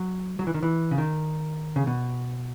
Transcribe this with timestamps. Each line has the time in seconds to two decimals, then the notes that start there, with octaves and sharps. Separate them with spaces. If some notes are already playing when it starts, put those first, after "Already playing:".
Already playing: F#3
0.39 F#3
0.47 E3
0.54 D#3
0.63 E3
0.91 C#3
0.98 D#3
1.76 C#3
1.87 B2